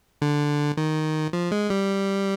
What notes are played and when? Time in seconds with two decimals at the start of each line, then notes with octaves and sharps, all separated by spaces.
0.22 D3
0.77 D#3
1.33 F3
1.52 G#3
1.70 G3